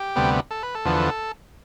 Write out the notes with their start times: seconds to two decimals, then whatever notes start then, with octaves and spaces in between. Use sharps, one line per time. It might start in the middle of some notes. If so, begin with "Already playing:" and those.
Already playing: G4
0.16 D2 C3 G3 B3
0.51 A4
0.63 B4
0.75 A4
0.85 E2 D3 F3 B3